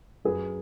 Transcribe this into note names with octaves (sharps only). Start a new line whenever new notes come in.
F#2 G#4 B4